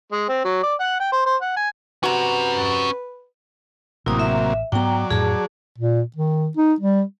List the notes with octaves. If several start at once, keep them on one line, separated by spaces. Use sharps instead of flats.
G#3
C4
F#3
D5
F#5
G5
C5
C5
F#5
G#5
C3 C#4 F#4 B4 A#5
A1 C3 F#3 A#3 E4 D#6
E5
G#2 F#3 B3 D5 G5 A#5
F2 A2 G#4 A5
A#2
D#3
D#4
G3